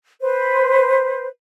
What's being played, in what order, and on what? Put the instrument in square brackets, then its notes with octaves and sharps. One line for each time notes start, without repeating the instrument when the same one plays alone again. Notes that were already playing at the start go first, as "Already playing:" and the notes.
[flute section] B4 C5